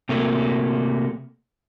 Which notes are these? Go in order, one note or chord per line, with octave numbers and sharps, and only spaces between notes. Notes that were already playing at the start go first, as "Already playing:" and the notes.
C3 A3 A#3